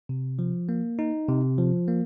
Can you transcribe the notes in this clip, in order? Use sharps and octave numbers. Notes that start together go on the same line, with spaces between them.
C3
F3
A#3
D#4
C3
F3
A#3